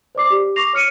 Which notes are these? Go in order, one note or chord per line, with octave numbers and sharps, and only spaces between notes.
C5 D5 D6 C7
G4
C#6 D6 A#6 C7 F7
C#5 F6 C#7 D#7